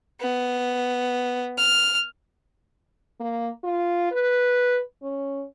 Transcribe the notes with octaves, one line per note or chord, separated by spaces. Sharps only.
B3
F6
A#3
F4
B4
C#4